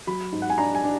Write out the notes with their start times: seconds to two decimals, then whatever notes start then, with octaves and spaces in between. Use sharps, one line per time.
0.07 F#3 B5
0.32 G#2
0.42 F#5
0.50 G#5
0.58 D4 A#5
0.75 G#5
0.84 D4